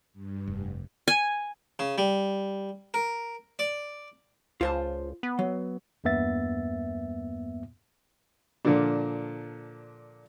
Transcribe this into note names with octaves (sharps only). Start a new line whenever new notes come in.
G2
F1
G#5
C#3
G3
A#4
D5
C#2 F4 C5 A5
B3
F#3
E2 G2 A#3 B3 E5 A6
A#2 D3 F3 D4